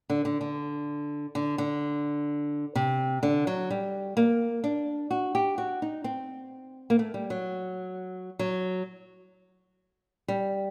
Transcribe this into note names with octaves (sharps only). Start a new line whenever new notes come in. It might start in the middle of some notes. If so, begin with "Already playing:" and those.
D3
D3
D3
D3
D3
C3
D3
F#3
G3
A#3
D4
F#4
G4
F#4
D#4
C4
A#3
A3
G3
F#3
F#3
G3